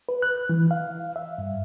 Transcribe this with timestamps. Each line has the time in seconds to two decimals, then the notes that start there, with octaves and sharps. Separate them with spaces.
0.09 B4
0.22 F#6
0.49 E3
0.71 F5
1.16 E5
1.38 G2